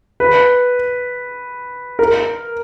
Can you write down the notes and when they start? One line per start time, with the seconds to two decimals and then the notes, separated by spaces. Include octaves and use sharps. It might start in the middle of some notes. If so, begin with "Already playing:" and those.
0.20 B4
1.99 A#4